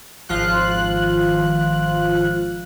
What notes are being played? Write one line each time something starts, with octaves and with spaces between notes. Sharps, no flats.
G#1 F3 F4 F#6